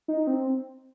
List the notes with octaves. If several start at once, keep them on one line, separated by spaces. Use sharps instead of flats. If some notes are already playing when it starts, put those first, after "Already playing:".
D#4
C4